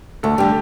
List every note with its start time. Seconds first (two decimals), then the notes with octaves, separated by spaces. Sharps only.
0.23 D2 A4
0.38 D3 G3 G4